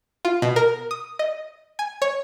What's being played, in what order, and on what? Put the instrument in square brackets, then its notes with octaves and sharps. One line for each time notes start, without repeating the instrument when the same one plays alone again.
[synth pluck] F4
B2
A#4
D#6
D#5
G#5
C#5